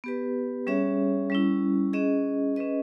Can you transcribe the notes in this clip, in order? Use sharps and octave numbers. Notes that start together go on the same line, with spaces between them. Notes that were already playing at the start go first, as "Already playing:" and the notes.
B3 G4 B4
G3 C#4 G#4 C#5 E5
G3 C#4 E4
C#4 G#4 D#5
C#4 G#4 B4 D#5